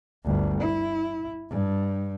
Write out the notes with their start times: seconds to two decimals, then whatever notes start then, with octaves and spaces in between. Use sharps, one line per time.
0.24 G1 D2
0.61 E4
1.50 G2